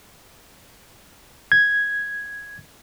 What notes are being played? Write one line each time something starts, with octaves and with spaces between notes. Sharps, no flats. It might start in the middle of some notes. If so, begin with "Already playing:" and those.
G#6